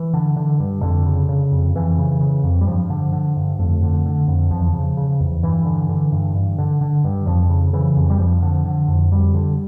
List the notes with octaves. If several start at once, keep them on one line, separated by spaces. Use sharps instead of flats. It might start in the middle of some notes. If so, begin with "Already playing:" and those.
Already playing: E3
D3
D3
G2
F2 D3
C#3
C#3
F2
F2 E3
C#3
C#3
F2
G3
G2 F3
D3
D3
G2
F2 A3
D3
D3
F2
E2 F3
C#3
C#3
E2
G2 E3
D3
D3
G2
G2
D3
D3
G2
F2 F3
C#3
C#3 E3
F2
G3
F2 F3
D3
D3
F2
F2 G3
D3